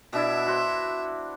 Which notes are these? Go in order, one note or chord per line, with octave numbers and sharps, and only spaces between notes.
B2 D4 E4 E5
F#4 C5